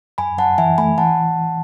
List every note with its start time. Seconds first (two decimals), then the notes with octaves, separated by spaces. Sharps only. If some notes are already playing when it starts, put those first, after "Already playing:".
0.18 F#2 G#5 B5
0.38 F#2 F#5 A5
0.58 E3 E5 G#5
0.78 A3 G#5 B5
0.98 E3 F#5 A5